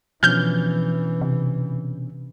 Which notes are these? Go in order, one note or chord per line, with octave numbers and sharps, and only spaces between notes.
B2 E3 F3 C#4 D4 F6 G6
C3